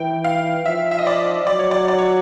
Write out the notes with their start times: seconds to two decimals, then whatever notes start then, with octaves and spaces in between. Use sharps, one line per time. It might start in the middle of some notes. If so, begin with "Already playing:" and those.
Already playing: E3 G5
0.24 F5
0.66 F3 E5
0.91 E5
0.98 D#5
1.07 D5
1.47 F#3 D5
1.59 C#5
1.71 D5
1.88 D5
1.98 C#5